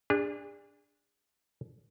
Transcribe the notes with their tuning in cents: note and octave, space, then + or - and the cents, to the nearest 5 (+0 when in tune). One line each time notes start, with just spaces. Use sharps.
D4 +0 G#4 -40